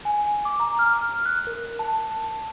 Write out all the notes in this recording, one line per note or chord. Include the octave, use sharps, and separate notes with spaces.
G#5
D6
A#5
F6
F#6
A#4
A5